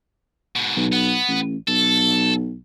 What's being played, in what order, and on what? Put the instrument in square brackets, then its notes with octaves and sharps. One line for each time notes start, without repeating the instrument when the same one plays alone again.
[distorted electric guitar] G#2 B2
[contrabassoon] B1
[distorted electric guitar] B3
[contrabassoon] A1
[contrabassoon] B1 [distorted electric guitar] A4